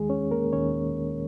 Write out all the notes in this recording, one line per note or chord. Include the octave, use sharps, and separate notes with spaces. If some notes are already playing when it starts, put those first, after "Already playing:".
Already playing: D#2 D#3 G#3 G#4
C#4 C#5
A#3 A#4
D#2 D#3 C#4 C#5